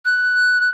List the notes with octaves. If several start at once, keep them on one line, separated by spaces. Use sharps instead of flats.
F#6